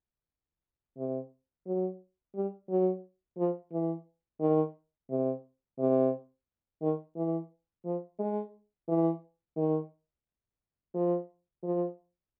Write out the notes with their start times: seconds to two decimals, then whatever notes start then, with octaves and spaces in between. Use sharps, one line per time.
0.97 C3
1.66 F#3
2.35 G3
2.69 F#3
3.38 F3
3.72 E3
4.41 D#3
5.10 C3
5.79 C3
6.82 D#3
7.16 E3
7.85 F3
8.19 G#3
8.88 E3
9.57 D#3
10.95 F3
11.63 F3